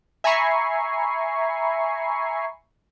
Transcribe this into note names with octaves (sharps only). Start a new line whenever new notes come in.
E5 G#5 A#5 B5 C#6 C7